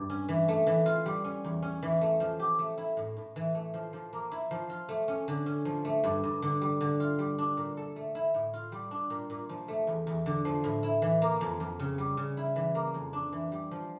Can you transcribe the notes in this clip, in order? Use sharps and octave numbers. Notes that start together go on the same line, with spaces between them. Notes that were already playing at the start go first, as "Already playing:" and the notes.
Already playing: G2
C#4
E3
A3
E3
F4
G3
C#4
E2
C#4
E3
A3
F3
G4
A3
E4
A2
A2
E3
A3
F3
F3
A#3
E4
F3
F4
A3
C#4
D3
C#4
F3
A3
G2
G2
D3
G3
D3
F4
G3
D4
A#2
A4
A3
E4
A2
F4
G3
D4
A#2
A#2
F3
A3
E2
E2
D3
F3
A2
E4
E3
A#3
F2
F2
C#3
G3
C#3
E4
E3
A#3
F2
D4
E3
G3
F3